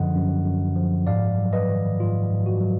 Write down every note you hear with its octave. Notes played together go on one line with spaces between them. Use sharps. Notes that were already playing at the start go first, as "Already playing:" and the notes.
Already playing: F#2 D3 F3 D#5 F#5
F#2
F#2
F3
G#2 D5 F5
F#3
B4 D#5
D#3
G#2 F4
G#2
F#4
F#3